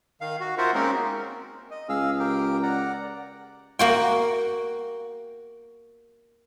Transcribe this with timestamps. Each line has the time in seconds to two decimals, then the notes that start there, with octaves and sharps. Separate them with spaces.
0.21 D#3 F5
0.40 F#4
0.58 F4 F#4 A#4 C5 E5 F#5
0.74 G#3 A#3 C4 C#4 D#4 A#4
1.71 D#5
1.89 C#2 G#4 F5 E6
2.20 G4 A#4 G5
2.63 D5 F#5 A#5
3.79 A#3 F#4 G5